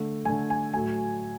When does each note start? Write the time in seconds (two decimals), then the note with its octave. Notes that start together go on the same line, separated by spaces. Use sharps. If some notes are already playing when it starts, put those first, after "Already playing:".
Already playing: D3 A3
0.25 A3 G#5
0.29 D3
0.50 G#5
0.74 A2 F#3 A3 G#5